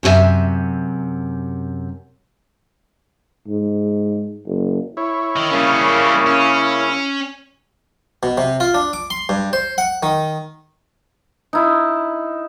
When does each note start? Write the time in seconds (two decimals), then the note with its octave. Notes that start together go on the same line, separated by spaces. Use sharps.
0.03 F#2 C3 E4 F#4 E5 G#5
3.48 G#2
4.46 F#1
4.97 E4 C#5
5.36 D#3
5.51 C#3 G3 A#3 C#4
6.26 C#4
8.23 B2
8.38 C3
8.60 F4
8.74 D4
8.93 D6
9.10 C6
9.29 G2
9.53 C5
9.78 F#5
10.03 D#3
11.53 D#4 E4